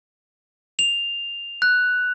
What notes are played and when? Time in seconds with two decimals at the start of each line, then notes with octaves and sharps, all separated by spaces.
0.79 F7
1.62 F#6